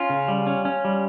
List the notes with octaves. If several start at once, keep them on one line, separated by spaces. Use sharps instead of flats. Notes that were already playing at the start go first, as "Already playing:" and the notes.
Already playing: C#4 F4
C#3
G3
C#4
C#4
G3